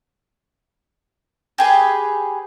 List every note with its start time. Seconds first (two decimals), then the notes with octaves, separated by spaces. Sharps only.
1.58 G4 G#4 B4